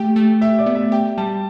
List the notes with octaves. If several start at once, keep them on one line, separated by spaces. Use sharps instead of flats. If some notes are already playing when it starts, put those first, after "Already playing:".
Already playing: A3 G4 G5
A3
G4 E5
D5
B3
E5
G4 G5
G3 A5